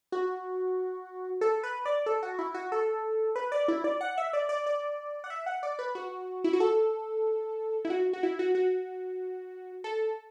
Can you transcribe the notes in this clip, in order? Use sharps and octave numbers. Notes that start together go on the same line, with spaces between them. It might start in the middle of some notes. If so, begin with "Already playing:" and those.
F#4
A4
B4
D5
A4
F#4
E4
F#4
A4
B4
D5
E4
D5
F#5
E5
D5
D5
D5
F#5
E5
F#5
D5
B4
F#4
E4
F#4
A4
E4
F#4
F#4
E4
F#4
F#4
A4